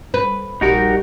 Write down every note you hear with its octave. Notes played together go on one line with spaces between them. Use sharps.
B4
A#1 G3 D#4 F#4 G4 A#4